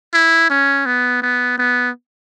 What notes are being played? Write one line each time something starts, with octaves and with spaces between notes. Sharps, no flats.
E4
C#4
B3
B3
B3